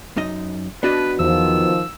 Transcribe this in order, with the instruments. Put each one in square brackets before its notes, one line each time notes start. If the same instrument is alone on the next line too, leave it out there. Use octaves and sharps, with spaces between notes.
[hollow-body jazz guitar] F#2 D#4 D#5
[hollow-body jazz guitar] B3 F#4 D#5 [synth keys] D4 [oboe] B4
[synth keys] E2 [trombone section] D#3 F3 [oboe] E6